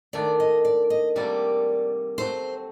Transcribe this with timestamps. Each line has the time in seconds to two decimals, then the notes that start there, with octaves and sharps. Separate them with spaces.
0.13 D#3 A3 D4 D5
0.40 D#5
0.65 D5
0.90 D#5
1.16 C3 G3 A#3 F#4 A4 D5
2.18 F#3 A3 C4 F#4 C5